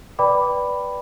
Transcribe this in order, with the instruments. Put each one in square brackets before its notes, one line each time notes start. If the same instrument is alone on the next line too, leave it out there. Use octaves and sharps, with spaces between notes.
[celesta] B4 D5 G5 B5 D6